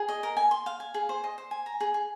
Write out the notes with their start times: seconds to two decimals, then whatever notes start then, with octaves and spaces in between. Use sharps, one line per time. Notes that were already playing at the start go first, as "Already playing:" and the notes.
Already playing: G#4
0.09 D#5
0.23 A#4
0.37 G#5
0.51 C6
0.66 F5
0.80 G#5
0.94 G#4
1.09 C5
1.24 D#5
1.38 C5
1.51 G#5
1.66 A#5
1.80 G#4
1.94 G#4